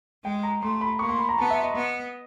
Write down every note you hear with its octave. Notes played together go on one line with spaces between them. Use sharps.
G#3 G5
A#5
A3 C6
B5
A#3 C#6
C6
B5
A#5
B3 A5
E5
D#5
B3